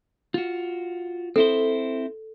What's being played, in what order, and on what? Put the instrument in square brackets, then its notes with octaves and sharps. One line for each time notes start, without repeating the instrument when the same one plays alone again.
[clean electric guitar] F4 F#4
[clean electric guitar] C4 E4 C5 [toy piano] A4